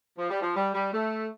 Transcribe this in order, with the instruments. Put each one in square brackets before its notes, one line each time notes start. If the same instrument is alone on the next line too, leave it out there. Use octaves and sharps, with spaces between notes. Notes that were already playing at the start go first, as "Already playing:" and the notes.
[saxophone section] F3
G3
F3
G3
G3
A3